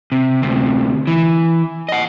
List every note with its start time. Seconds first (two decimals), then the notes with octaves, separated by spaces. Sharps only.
0.12 C3
0.42 D2 C3
1.07 E3
1.89 D#5 F#5